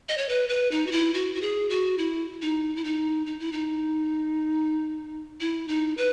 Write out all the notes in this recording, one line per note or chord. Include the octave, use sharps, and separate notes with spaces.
D#5
C#5
B4
B4
D#4
F#4
E4
F#4
F#4
G#4
F#4
E4
D#4
E4
D#4
D#4
E4
D#4
E4
D#4
B4